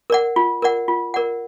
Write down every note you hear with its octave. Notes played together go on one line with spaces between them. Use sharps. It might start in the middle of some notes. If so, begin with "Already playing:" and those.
A#4 D5 F#5
F4
A#4 D5 F#5
F4
A#4 D5 F#5